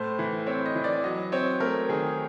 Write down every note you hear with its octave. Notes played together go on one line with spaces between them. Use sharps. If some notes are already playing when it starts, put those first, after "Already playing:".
Already playing: A2 A3 C5
E3
C4 C#5
D#5
E3
D5
F#3 D#5
C4 C#5
A3 A#4
D#3 G#4